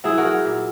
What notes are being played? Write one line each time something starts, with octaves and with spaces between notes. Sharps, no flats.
F#3 E4 G#4
F#4 A#4
F#3
A#2